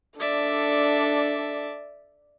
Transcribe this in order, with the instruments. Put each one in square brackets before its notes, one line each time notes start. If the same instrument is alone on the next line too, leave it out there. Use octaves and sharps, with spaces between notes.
[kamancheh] D4 A4 [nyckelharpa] D5 E5